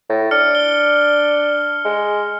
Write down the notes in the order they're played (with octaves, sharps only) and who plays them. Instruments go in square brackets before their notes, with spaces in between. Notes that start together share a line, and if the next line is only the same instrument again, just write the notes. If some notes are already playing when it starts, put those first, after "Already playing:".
[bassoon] A2
[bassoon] D4 [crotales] F6 C#7
[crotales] G7
[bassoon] G#3